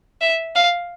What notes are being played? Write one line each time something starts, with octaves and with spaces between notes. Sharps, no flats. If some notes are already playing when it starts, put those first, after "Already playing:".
E5
F5